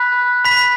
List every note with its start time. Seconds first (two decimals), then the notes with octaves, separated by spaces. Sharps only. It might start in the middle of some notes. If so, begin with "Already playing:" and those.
Already playing: B5 F#6 B6
0.45 B5 F#6 B6